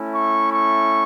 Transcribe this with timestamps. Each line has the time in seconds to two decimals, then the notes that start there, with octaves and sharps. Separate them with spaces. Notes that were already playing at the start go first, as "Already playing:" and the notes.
Already playing: A3 C#4 E4
0.14 C#6
0.51 C#6